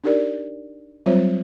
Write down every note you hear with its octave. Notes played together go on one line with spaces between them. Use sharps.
D4 D#4 G4 A#4 D5
F#3 G3 C4 F4 C5 C#5